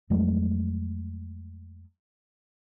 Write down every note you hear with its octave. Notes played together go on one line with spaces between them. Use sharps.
F2 F#3 G#3 A3